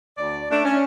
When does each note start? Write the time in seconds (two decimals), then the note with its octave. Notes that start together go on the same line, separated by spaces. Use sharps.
0.18 D2 D5
0.50 A3 D4
0.65 C#4